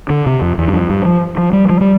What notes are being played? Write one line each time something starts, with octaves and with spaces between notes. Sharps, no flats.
D3
C3
F2
E2
G2
F2
G2
F3
F3
G3
F3
G3